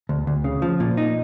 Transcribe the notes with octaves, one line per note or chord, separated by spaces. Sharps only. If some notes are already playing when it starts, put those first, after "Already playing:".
D2
D2
C#3
F3
A#2
D#4